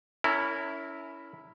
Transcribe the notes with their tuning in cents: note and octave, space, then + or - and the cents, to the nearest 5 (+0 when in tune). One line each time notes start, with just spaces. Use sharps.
C#4 +20 E4 -5 A#4 -25